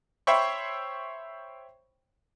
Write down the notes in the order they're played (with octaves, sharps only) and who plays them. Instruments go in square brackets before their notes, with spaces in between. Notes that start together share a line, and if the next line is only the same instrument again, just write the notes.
[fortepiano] C5 C#5 E5 G5 B5 C#6